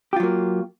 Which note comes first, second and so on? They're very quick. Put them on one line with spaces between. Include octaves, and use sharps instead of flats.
G4 F4 F#3 A#3